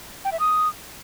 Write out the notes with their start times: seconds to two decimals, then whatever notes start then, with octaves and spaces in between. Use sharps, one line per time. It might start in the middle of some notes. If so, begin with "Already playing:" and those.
0.25 G5
0.32 E5
0.39 D#6